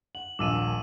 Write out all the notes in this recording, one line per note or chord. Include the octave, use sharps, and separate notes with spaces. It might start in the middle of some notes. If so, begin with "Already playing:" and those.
F#5 F#7
D#1 A#1 A5 D6 E6 D#7